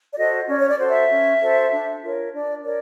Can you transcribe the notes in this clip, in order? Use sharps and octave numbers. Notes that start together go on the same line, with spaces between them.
D5
F#4 A4 C5 D#5
C#4 D5
C#5
D5
F#4 A4 C5
E5
C#4
F#4 A4 C5
D4
F4 A#4 C#5
D4 D5
A#4 C#5 D5